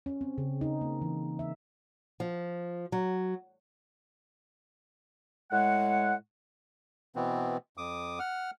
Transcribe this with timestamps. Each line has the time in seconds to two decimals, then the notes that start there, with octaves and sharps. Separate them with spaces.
0.06 C#4
0.21 C4
0.38 C#3
0.61 D#4
0.81 A#3
1.01 E3
1.39 E5
2.20 F3
2.92 F#3
5.51 A2 G#3 F#5
7.16 B2 E3 B3 C4
7.77 F2 D6 D#6
8.19 F#5 F6